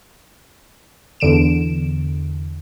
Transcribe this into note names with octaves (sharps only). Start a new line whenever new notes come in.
E2 D3 D7 E7